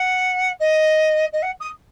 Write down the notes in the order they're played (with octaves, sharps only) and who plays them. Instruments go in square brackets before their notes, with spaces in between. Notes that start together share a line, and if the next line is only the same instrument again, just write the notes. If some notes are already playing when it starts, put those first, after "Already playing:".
Already playing: [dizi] F#5
D#5
D#5
F#5
D#6